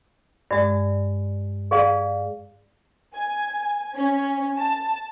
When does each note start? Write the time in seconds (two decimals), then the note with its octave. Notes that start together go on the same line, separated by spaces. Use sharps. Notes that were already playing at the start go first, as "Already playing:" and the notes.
0.51 G2 G#3 D5
1.71 G#4 D5 F5
3.14 G#5
3.96 C#4
4.57 A5